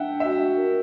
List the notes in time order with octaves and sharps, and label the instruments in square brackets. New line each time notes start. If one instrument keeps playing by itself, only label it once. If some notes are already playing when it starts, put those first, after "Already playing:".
Already playing: [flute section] D4 [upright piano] E5 F#5 G5
[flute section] F#4 [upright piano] E5
[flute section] A#4